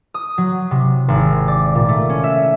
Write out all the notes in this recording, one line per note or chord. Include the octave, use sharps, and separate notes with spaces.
D#6
F#3
C3
G#1
D5
A#2
A3
C#4
E5